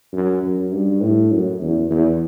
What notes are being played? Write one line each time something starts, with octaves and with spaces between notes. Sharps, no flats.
F#2
F#2
G2
A2
F#2
E2
E2